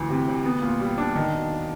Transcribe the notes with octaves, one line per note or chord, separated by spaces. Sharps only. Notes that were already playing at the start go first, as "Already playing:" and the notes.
Already playing: D2 E3
C3
D2
B3
A#2
G3
D4
D#3
E1